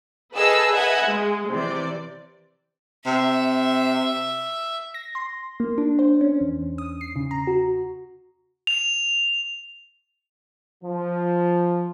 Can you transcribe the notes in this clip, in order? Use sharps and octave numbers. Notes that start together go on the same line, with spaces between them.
G#4 A4 B4 D#5 F5 E6
B4 D#5 E5 F#5 G#5 G#6
G#3
C3 E3 D5
C3 E5
A#6
C6
A#3
D4
C5
C#4
E2
D#6
C7
C#3
A#5
F#4
F7
F3